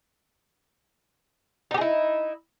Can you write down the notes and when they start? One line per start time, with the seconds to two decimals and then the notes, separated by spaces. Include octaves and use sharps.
1.71 D#4
1.74 G4
1.78 G#4
1.81 E4